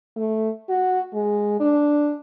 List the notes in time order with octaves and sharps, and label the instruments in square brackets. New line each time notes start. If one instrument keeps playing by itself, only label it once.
[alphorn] A3
F#4
G#3
D4